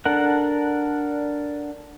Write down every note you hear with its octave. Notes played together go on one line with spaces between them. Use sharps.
D4 A4 A#4 F#5